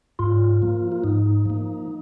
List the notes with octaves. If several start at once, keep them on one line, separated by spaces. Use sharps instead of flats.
G#2 F4
F3 A#3
F4
G#2 D#4
F3 A#3